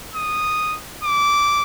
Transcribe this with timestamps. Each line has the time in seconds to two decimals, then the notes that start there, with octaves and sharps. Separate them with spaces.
0.14 D#6
1.04 D6